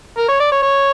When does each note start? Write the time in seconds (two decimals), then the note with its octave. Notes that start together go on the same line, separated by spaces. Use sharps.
0.18 A#4
0.29 C#5
0.40 D5
0.52 C#5
0.63 C#5